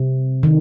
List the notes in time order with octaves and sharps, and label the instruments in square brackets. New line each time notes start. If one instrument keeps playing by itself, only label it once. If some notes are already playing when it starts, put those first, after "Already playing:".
Already playing: [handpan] C3
D#3